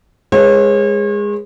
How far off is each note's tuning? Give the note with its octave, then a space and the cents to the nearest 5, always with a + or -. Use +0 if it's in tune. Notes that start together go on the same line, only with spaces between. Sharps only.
G#3 -15 A#4 +45 C#5 -40